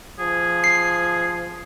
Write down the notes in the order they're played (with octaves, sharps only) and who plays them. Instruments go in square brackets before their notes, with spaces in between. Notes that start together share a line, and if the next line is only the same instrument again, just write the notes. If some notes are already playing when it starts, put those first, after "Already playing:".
[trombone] F3 [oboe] G#4
[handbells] C7